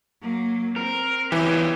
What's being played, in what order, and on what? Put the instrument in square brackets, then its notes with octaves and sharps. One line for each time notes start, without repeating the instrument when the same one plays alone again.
[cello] F#3 A#3
[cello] C4 [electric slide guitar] A#4
[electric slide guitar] E2 C#4 G4 [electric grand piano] E3